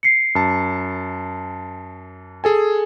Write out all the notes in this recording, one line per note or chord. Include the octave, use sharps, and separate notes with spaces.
C7 C#7
F#2 A5
G#4 A4 G#5